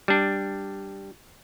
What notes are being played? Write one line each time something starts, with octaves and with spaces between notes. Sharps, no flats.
G3 D4